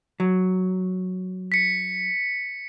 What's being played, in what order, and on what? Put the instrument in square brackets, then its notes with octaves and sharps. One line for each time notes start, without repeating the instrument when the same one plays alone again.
[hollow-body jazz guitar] F#3
[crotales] B6 C#7